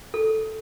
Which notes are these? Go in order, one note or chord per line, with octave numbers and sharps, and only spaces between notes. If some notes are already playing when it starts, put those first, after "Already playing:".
A4